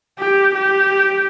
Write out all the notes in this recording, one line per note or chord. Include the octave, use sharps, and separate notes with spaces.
G4
G4